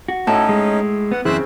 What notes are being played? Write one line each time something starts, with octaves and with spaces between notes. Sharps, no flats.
F#4
A2 C#4 D#4 A4
G#3
B3 F#5
F#2 C#3 E3 C4 C5 E5 F#6